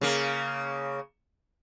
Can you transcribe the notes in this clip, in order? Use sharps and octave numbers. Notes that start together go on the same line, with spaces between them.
C#3 A#3